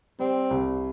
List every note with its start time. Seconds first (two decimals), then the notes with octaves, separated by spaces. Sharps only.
0.19 G3 C4
0.51 C2